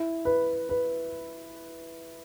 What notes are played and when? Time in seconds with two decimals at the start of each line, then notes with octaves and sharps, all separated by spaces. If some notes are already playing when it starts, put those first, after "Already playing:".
Already playing: E4
0.25 B4
0.69 B4